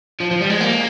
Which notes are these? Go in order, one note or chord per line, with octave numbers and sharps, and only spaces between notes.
F3
F3
G3
G#3
A#3